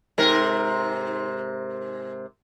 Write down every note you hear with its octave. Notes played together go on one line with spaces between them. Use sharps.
G#2 C3 A#4